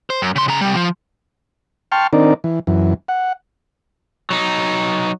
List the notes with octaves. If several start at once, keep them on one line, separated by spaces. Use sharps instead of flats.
C5
F#2
C#3 C6
C#3 A#5
C3 G3
F3
G5 A5 C6 C#6 F6
D#3 C4 D4 D#4 A#4 D5
E3
F#2 E3
F#5
F#3 D#4